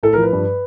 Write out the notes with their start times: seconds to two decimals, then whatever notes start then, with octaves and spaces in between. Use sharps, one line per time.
0.03 A2 A4
0.13 A#4
0.17 F3
0.23 B4
0.32 G2